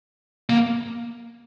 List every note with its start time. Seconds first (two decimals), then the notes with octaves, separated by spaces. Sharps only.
0.50 A#3